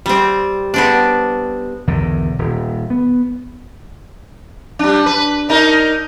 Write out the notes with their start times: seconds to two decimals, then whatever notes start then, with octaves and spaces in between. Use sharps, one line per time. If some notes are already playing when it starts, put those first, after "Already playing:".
0.06 G3 C4
0.74 B3 C4 D4
1.87 B1 E2 D3 D#3
2.39 D#1
2.90 B3
4.79 G3 D4
5.06 B4
5.49 D4 D#4 A#4